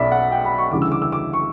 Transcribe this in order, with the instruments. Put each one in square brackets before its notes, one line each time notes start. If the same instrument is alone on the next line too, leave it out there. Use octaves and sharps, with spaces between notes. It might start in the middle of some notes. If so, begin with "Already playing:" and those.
Already playing: [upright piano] B1 B2 D5 E5 B5
F#5
G5
B5
C#6
D2 C#3 E3 G3 D6
E6
D6
E6
D6
C#6